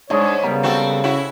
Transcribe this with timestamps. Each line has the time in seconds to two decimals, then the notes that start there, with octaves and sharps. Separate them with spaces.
0.10 G#2 G#3 D4 C#5
0.43 C#3 G3 B3 A#4
0.63 C4 F#4 A4
1.04 C#4 E4 F#4